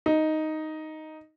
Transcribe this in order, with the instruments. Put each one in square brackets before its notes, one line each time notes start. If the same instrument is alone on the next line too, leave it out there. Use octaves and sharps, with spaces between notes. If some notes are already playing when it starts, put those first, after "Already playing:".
[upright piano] D#4